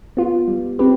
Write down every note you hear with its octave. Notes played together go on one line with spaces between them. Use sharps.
B3 F4
G3
C4 G4 B4